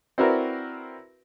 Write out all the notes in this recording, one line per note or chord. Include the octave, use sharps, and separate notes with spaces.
C4 E4 F#4 A#4 B4 D5